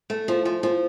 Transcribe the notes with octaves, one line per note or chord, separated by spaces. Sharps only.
A3
F3
F3
F3